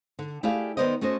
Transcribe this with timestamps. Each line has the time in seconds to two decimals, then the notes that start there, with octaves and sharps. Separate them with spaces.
0.19 D3
0.43 A3 E4 G4 G#4 D5 F5
0.77 D#3 B3 D#4 C5 D5 D#5
1.01 A3 C#4 F#4 C5 D#5